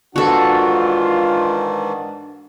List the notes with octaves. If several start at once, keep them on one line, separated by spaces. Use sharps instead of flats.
G#2 D#3 E3 D4 F4 F#4 A4